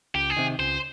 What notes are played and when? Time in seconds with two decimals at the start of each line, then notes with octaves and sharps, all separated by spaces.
0.15 C#2 G4
0.30 G#4
0.37 C3 D#3
0.59 C#2 C5